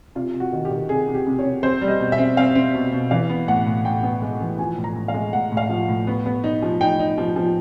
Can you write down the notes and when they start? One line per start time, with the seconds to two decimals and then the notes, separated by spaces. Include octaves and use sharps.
0.15 C3 F4
0.34 C3
0.40 F#4
0.53 D#3
0.65 G4
0.70 D#3
0.89 C3 G#4
1.08 C3
1.14 G4
1.27 C3
1.39 C#5
1.45 C3
1.63 C4 C5
1.81 G3
1.88 D#5
2.00 B2
2.12 E5
2.18 C4
2.37 C4 F5
2.55 C4
2.74 B2
2.92 B2
3.11 E3 F5
3.30 B3
3.48 A2 F#5
3.66 A2
3.85 A2 G5
4.03 B3
4.22 G#3
4.40 E3
4.59 F3 G#5
4.78 A2
4.84 A#5
4.96 A2
5.08 F5
5.14 G#3
5.33 A2 F#5
5.52 A2
5.57 F5
5.70 F3
5.88 A2
6.07 B3
6.26 B3
6.44 D#4
6.62 F3
6.81 D#4 G5
6.99 D#4
7.18 F3
7.36 F3